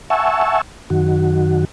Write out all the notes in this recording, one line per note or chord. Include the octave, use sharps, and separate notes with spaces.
E5 F#5 G#5 A5 C#6 E6
F#2 D#3 F#4